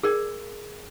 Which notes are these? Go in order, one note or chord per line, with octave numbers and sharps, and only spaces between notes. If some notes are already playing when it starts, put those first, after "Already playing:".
G#4 A#4 D5